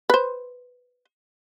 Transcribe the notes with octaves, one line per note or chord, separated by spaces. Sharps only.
B4 C5